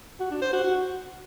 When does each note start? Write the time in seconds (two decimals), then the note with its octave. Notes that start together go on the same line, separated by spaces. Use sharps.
0.20 F#4
0.31 D4
0.42 C5
0.53 F#4
0.64 F#4